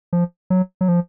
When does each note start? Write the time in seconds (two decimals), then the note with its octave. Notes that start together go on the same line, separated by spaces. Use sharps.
0.13 F3
0.50 F#3
0.81 F#3
0.88 F3